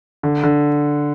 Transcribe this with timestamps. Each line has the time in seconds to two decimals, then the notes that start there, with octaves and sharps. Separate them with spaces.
0.23 D3
0.43 D3